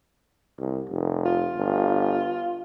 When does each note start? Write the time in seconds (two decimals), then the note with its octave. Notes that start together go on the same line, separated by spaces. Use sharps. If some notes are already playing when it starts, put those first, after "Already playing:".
0.59 C2
0.90 F1
1.25 F4
1.56 G1